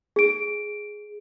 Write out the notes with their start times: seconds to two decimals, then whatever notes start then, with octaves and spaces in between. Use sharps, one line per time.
0.16 G#4 D7